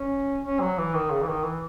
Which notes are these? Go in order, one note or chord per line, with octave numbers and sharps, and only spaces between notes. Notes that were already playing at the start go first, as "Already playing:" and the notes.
Already playing: C#4
C#4
F#3
E3
D#3
C#3
E3
D#3
E3